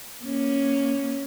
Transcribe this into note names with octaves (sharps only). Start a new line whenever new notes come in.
A#3 C#4